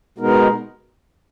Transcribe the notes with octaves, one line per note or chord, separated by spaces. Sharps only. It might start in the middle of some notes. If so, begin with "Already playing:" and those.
B2 G#3 B3 D#4 A#4